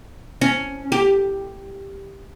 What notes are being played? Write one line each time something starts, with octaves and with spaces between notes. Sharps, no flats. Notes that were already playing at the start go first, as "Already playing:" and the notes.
C#4
G4